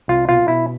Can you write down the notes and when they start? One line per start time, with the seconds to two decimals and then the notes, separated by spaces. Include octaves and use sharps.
0.08 C2 F4
0.28 B2 F4
0.48 B2 E4